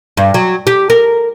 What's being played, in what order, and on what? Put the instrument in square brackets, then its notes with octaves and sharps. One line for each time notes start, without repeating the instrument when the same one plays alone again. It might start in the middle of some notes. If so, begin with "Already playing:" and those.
[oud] G2
F#3
G4
A#4